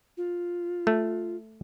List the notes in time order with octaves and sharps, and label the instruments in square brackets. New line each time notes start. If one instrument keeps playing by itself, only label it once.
[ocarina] F4
[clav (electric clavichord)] A3